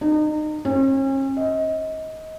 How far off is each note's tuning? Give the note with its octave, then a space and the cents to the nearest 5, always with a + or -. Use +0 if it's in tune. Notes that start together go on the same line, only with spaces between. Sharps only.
D#4 -30
C#4 -40
D#5 +25